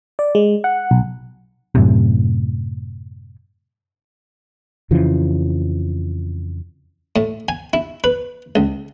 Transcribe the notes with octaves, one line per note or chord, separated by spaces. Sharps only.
D5
G#3
F#5
B1
F#2 A2 C3
F2 C#3 E3 F3
A2
G#5
E4
B4
C#2